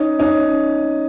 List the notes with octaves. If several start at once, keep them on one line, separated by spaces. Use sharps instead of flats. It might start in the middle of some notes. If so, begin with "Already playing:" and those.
Already playing: C#4 D#4
C#4 D#4